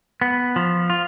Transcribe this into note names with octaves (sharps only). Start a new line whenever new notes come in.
B3
F3
F4